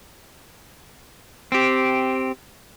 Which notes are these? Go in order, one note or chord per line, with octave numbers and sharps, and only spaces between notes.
C4 G4